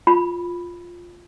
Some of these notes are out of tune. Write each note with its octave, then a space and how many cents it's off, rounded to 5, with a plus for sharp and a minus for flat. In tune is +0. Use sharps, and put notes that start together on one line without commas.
F4 +0 B5 +0